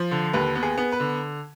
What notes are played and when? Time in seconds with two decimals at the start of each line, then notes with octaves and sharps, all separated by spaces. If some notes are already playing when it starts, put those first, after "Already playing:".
Already playing: F3
0.11 D3
0.33 D#2 B4
0.55 B3
0.63 G#4
0.78 B3
0.92 B4
1.00 D3